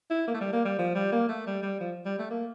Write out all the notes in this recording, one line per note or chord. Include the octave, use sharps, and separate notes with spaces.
E4
A#3
A3
G3
A#3
G3
F3
G3
A#3
A3
G3
G3
F3
G3
A3
A#3